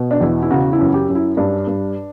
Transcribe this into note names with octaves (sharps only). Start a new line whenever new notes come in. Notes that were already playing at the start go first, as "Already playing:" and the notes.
Already playing: B2
D4
E2 E4
E4
C#3 F#4
E4
F#2
G4
F#2
E4
G2 D4
G2